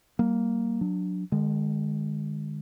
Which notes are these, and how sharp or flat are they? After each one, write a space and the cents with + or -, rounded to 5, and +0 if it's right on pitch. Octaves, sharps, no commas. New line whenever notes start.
G3 -35 A#3 +0
F#3 -20 D4 +0
D#3 -45 G#3 -5